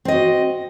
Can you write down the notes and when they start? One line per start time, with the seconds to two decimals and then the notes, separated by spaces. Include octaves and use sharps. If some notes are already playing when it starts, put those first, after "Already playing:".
0.05 C4
0.08 D#5
0.11 F#4